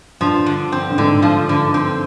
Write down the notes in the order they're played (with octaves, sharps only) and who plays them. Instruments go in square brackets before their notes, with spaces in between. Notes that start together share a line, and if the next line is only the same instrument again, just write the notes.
[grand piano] G2 [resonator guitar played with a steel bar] F3
[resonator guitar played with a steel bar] D3
C4
[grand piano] G2
[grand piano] G#2 [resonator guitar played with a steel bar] D3
[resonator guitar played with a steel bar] F3
D3
C4